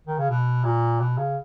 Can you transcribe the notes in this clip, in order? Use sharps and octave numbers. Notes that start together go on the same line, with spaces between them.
D#3
C#3
B2
A#2
B2
C#3